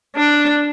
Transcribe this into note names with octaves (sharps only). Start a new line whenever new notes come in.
D4